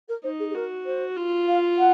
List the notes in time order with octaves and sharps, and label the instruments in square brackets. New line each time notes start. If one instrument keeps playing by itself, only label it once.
[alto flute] A#4
[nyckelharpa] D#4 [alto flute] C5
[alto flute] G#4
G#4
[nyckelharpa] F#4 [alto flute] A#4
[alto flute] C5
[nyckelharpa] F4
[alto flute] F5
F#5